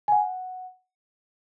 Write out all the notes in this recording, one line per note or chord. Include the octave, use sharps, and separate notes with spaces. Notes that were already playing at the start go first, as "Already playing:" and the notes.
G#5
F#5